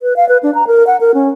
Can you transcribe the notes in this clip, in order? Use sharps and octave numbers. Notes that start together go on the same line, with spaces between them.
B4
F5
B4
D4
A#5
A#4
F#5
A#4
C#4